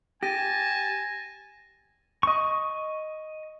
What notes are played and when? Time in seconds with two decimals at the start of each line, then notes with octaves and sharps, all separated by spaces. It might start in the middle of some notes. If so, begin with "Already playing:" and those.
0.23 G4 G#5 A5 A#6 D#7
2.23 D#5 C#6